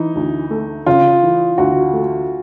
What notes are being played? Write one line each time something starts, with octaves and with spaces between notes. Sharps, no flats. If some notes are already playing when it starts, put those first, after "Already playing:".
Already playing: E3 D#4
D2
A3
C#3 F4
E3
D2 F#4
A3